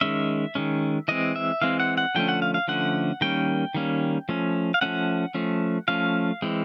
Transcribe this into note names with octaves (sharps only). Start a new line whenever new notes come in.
D#3 G#3 C#4 E5
D#3 G#3 C#4
E3 G#3 C4 D#5
E5
E3 G#3 C4 F5
F#5
F#5
D3 F3 A3 C#4 G5
F#5
F5
F5
D3 F3 A3 C#4 F#5
D#3 G3 A#3 C#4 G5
D#3 G3 A#3 C#4
F3 A3 C#4
F5
F3 A3 C#4 F#5
F3 A3 C#4
F3 A3 C#4 F5
E3 G#3 C4